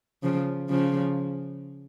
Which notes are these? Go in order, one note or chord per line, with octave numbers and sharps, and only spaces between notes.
C#3 F3
C#3 F3